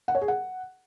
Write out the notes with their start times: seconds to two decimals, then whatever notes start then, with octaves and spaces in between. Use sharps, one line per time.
0.08 F#5
0.15 C#5
0.21 G#4
0.28 F#5